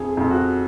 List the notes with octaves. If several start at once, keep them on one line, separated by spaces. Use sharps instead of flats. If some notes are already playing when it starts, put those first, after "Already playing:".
Already playing: F2 G#4
F2
F#4